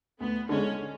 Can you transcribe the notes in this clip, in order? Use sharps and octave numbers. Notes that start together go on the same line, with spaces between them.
D2 B3
D3 G#3 C#4